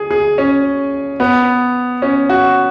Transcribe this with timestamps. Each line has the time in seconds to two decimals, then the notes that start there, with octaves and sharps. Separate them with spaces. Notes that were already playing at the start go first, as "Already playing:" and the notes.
Already playing: G#4
0.11 G#4
0.38 C#4
1.20 B3
2.02 C#4
2.29 F#4